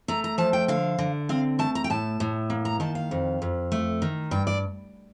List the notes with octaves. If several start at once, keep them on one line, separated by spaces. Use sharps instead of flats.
A3 A#5
A#5
F3 A5
G5
D3 F5
D3
C4 F5
A3 A5
A#5
G5
A2 A5
A2
A#3
A#5
D#3 A5
F5
F2
F2
A3
D#3
G2 G5
D5